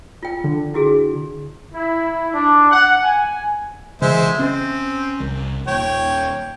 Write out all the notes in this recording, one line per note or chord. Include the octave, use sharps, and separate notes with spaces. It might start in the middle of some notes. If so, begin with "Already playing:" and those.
F4 G5
D3
E4 F#4 G#4
E4
D4
F#5
G#5
C#3 E3 G#3 C5 E5
C4 C#4
C2
D#1 C#5 G5